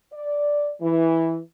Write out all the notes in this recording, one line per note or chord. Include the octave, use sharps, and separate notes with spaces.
D5
E3